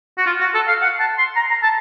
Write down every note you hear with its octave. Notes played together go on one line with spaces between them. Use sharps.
F#4
F4
F#4
A4
F5
F#5
A5
C6
A#5
A#5
A5